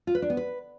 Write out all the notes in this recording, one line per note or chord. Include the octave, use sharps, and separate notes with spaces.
F4
B4
D4
B3
B4